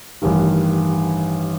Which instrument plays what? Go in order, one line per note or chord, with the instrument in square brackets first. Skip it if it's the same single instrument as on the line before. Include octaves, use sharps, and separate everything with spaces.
[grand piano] A1 G2 D#3